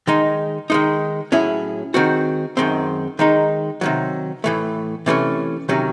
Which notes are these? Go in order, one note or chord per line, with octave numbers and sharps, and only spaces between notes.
D#3 G#3 D#4
D#3 G#3 D#4
A2 F#3 C#4 E4 G#4
D#3 G#3 C4 F#4
F#2 D#3 G#3 C4
D#3 G#3 D#4
C3 D#3 F#3
A2 E3 A3
C3 E3 A3 C#4
C3 D#3 F#3 C#4